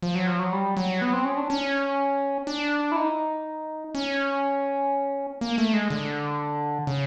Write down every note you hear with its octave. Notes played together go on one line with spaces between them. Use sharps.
F3
F#3
F3
F#3
G3
F#3
B3
C4
C#4
D4
C#4
D4
E4
D#4
C#4
A#3
A3
G#3
D3
C#3